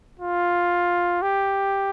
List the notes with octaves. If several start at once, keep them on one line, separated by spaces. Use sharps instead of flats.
F4
G4